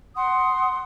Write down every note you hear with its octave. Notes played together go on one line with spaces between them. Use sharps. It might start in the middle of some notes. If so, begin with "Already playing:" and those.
F#5 C6 D#6